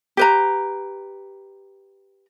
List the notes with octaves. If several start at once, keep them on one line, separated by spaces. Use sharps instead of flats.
G4 B4 A#5